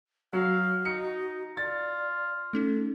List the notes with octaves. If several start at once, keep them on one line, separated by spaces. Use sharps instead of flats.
F#3 F#4 F5
D#4 C#7
F4 D5 A6
A3 C#4 D#4 A4